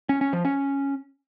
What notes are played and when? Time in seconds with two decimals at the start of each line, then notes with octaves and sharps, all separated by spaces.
0.09 C#4
0.21 C#4
0.33 F3
0.45 C#4